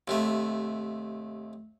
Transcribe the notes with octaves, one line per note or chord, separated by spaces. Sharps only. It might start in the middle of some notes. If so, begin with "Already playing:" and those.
D#2 C3 A3